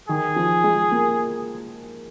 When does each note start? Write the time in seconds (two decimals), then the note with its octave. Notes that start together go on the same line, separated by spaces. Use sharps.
0.09 D#3 G#4
0.36 F3
0.64 G#3
0.91 A#3